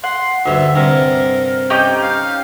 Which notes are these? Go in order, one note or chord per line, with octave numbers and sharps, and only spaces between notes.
F#5 C6
D2 G2 E5
G2 C3 A#4
C#4 D#4 G4 G5
F5